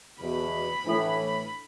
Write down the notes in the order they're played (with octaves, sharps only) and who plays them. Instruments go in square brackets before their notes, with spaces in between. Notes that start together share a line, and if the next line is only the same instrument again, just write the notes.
[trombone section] E2 B2 [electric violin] B5
[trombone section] A2 E3 [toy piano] D4 E4 A4